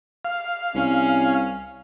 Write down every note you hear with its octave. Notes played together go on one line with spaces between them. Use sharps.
F5
C2 C#4